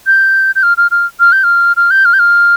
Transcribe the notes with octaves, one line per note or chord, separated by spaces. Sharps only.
G6
G6
F6
F6
F6
F6
G6
F6
F6
G6
F6
G6
F6